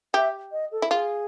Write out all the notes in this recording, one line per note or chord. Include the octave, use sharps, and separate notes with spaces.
G4 E5
D#5
A4
E4
F4 G#4